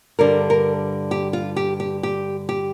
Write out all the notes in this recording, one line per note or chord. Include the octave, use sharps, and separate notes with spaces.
G2 D3 G3 A#4
A#4
G4
F4
G4
G4
G4
G4